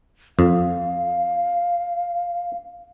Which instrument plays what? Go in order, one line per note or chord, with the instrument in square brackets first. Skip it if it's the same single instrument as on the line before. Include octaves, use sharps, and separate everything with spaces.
[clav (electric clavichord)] F2 [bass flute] F5